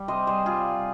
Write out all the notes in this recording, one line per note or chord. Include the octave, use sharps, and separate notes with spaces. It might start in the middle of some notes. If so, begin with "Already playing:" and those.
Already playing: G3
C3 C5 D#5
G3 G#4 C5
G3 F4 G#4